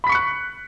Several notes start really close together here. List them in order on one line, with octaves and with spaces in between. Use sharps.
B5 B6 C#6 C#7 F#6